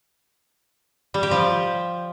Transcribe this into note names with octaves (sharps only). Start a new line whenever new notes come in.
G3
G4
F3